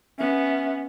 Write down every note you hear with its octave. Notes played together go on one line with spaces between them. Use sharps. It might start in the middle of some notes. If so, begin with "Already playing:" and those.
B3 C#4 E5